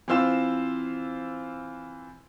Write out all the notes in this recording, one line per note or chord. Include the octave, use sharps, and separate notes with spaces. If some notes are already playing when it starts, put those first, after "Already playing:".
E3 C4 F4 C5 E6 E7